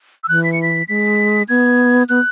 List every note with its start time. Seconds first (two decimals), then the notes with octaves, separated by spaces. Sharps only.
0.24 E6
0.28 E3 F#6
0.44 B6
0.53 C#7
0.62 B6
0.88 G#3 B6
1.49 B3 G#6
2.09 B3 F#6